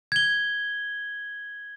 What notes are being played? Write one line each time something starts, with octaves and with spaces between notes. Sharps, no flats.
G#6 G7